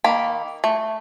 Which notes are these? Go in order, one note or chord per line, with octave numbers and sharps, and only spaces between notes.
D#3 A#3 B5
A3